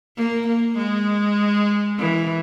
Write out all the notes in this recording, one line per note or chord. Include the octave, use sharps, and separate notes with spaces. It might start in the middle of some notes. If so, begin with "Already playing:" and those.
A#3
A#3
G#3
E3